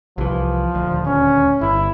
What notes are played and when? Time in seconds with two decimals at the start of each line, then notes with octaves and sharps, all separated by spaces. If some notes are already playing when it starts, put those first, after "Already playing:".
0.18 C2 E3 F3
0.75 D#1 D2
1.06 C#4
1.61 G1 E4